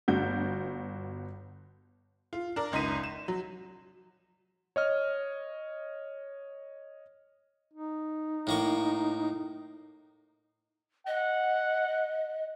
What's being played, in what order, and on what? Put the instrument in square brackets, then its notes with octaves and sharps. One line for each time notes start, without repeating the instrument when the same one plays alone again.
[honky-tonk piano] G1 F#4 G6
F4
D4 A#4
F#1 C#2 D#4 B6 D#7
E7
F#3
[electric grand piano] C#5 D#5 F6
[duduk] D#4
[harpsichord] A2 A#3 C#6
[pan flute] D#5 [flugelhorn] F#5